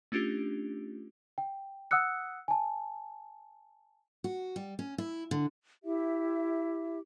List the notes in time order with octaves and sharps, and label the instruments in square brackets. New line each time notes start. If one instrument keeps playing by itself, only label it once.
[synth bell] A3 C#4 D4 F4 G4
[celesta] G5
F#5 D#6 E6 F#6 C#7
G#5 A5
[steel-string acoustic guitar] F#4
G3
C#4
E4
D3
[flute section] E4 G4 E5